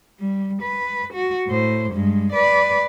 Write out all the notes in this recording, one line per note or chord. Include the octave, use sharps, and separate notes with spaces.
G3
B4
F#4
A2 C5
G2 G#3
B4 D5